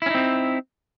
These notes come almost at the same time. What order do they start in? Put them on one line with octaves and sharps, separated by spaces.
E4 C#4 D#4 C4